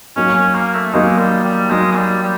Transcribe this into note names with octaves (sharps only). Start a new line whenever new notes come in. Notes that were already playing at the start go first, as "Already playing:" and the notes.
F#3 A#3 C#4 D#4
C#4
A#3
A3
F#3 G#3 A#3 D#4
G3
G3
F#3 G#3 A#3 D#4
G#3
G3
G3